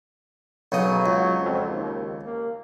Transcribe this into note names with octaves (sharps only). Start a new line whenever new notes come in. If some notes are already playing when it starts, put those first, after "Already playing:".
B1 C#3 F#3 D#5
C#2
F2
D#2
A#3